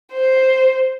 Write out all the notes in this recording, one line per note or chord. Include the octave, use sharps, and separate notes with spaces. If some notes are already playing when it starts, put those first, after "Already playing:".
C5